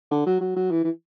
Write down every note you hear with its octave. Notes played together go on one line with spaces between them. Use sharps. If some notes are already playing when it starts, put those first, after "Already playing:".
D3
F#3
F#3
F#3
E3
E3